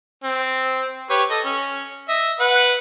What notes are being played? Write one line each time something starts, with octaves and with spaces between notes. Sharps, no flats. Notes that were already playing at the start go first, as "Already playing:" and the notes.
C4
G4 B4 C#5
A4 D#5
C#4
D#5 E5
B4 F#5